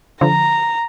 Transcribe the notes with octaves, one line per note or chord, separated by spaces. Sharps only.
D3 F3 A#5